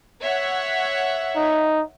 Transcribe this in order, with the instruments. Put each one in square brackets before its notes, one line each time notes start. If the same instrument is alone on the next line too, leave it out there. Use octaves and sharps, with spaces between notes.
[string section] C#5 E5 F#5
[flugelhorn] D#4